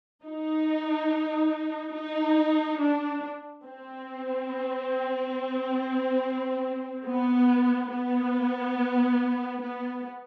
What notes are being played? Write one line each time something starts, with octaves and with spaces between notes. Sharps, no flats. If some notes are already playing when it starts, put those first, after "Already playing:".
D#4
D#4
D4
C4
B3
B3
B3